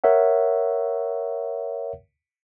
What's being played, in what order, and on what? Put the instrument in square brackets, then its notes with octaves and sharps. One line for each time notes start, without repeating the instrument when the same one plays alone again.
[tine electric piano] A#4 C#5 E5 F#5